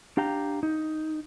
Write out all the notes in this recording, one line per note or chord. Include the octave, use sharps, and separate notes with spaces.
D4 G4 F5 G5 A#5
D#4